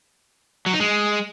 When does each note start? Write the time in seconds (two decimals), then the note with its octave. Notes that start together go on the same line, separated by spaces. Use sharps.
0.66 F#3
0.73 D#4
0.80 G#3